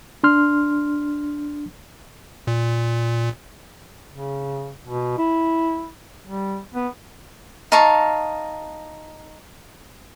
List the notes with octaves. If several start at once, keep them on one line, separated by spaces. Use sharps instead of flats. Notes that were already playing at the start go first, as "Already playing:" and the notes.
D4 C6 F6
A#2
C#3
B2
E4
G3
B3
D#4 F5 A5 C#6